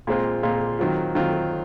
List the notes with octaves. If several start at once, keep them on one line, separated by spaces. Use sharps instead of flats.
A#2 G#3 C4 F4
A#2 G#3 C4 F4
D#3 F#3 C4 F4
D#3 F#3 C4 F4